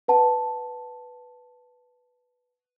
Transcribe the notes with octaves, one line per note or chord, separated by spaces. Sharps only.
B4 F#5 A5